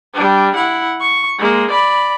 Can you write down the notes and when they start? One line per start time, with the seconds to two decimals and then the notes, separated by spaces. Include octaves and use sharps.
0.14 G3 D4
0.56 E4 F#5
1.01 C#6
1.39 G#3 A#3
1.71 D5 B5